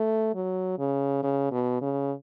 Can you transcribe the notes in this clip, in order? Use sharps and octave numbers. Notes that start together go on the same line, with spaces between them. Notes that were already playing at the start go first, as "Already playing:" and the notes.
Already playing: A3
F#3
C#3
C#3
B2
C#3